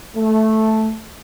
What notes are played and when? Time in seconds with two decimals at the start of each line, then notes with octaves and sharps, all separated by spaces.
0.16 A3